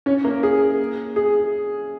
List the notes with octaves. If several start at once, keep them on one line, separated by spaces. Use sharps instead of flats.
C#4 C#5
A#3 A#4
G#4
G#4